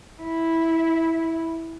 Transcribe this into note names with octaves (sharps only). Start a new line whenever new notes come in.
E4